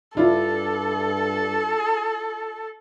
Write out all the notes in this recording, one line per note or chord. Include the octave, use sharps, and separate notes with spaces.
G2 D4 E4 F4 A4